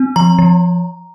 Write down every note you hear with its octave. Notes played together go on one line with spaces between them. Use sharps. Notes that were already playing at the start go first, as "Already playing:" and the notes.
Already playing: C4
F3 A#5
F3